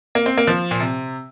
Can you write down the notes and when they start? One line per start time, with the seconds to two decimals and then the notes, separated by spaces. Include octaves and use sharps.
0.15 A#3
0.26 C4
0.38 A#3
0.47 F3
0.71 A#2
0.80 C3